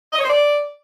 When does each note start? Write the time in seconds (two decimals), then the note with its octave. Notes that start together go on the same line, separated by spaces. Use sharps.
0.13 D#5
0.18 C#5
0.24 C5
0.29 D5